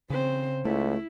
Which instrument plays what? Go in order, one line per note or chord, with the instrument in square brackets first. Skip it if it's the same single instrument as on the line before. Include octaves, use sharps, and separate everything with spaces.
[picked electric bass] C#3 [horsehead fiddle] C4 C5
[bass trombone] C#2 [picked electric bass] A3 [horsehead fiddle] E4